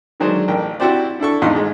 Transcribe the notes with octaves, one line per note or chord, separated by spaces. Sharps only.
D3 D#3 F#3 G#3 D4 C5
A1 A#4 G5
C4 E4 F#4 G4 C5 D5
D4 E4 A4 C#6
A1 E2 G#2 D#4 F4 C6
G#2 G#3